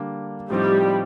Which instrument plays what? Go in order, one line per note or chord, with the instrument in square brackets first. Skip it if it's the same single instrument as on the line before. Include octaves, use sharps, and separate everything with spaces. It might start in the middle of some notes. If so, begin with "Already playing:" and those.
Already playing: [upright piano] D3 G3 A#3 D4
[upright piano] A2 F3 C4 D#4 [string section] G3